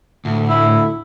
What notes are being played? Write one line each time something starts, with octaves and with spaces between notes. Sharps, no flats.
D2 A2
E4